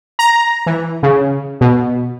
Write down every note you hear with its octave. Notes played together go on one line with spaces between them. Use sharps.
A#5
E3
C#3
B2